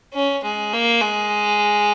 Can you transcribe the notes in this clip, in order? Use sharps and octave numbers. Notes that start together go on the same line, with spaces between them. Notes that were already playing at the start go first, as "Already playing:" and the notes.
C#4
G#3
A#3
G#3